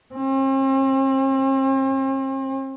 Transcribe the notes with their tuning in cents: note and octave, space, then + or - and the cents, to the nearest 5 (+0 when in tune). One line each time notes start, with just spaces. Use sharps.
C4 +45